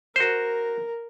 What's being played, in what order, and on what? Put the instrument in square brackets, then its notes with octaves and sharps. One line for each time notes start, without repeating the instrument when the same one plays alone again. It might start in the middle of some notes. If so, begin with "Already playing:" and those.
[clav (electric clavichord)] F#4 C5 [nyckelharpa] A#4